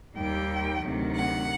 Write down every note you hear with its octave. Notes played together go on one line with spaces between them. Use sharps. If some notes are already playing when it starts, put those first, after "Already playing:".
D#2 D#3 G3 G5
D2 C3 D#3 F#3
F#5